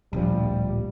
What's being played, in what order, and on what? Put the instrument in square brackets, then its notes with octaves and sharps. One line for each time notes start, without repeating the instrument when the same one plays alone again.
[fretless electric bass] D1 A#1 F3 [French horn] G3